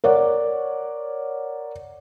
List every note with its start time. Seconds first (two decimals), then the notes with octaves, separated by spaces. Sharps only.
0.04 A#4 C#5 D5 F#5